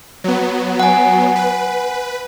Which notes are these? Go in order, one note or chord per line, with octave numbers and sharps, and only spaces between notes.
F#3 B3
F#5 G#5
B4